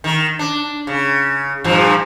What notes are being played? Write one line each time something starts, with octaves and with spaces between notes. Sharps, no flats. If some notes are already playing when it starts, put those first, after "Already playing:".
D#3
D4
C#3
G2 A#2 F3